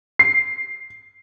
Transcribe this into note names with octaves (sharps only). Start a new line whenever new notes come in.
C7